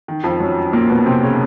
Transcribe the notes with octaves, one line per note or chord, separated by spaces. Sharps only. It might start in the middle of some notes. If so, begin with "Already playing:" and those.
D#3
F2 F3
F#2 F#3
A#2 A#3
B2 B3
C3 C4
C#3 C#4